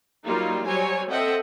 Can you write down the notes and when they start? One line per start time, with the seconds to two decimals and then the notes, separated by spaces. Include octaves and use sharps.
0.24 F#3 G3 A#3 D#4 F4
0.65 F#3 G3 C5 C#5 G#5
1.10 C4 A4 D#5 E5 F#5 G5